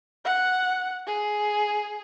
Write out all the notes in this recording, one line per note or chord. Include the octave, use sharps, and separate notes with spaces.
F#5
G#4